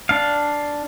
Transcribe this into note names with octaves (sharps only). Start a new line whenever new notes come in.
D4 F5